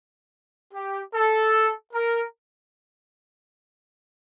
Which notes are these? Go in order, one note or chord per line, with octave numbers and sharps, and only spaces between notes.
G4
A4
A#4